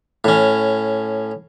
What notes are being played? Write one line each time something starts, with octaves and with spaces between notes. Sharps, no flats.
A2 C#4